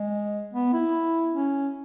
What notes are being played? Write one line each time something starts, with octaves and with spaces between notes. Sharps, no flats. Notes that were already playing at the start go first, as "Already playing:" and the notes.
Already playing: G#3
B3
E4
C#4